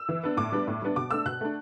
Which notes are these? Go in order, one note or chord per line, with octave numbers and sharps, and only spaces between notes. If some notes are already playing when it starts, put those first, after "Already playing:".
Already playing: E6
E3
B3 D4
A2 D6
G3 B3 D4
A2
G3 B3 D4
B2 D6
A3 D4 E6
B2 F#6
A3 D4